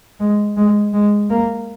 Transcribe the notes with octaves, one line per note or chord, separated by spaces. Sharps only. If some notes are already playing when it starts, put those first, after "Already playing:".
G#3
G#3
G#3
A#3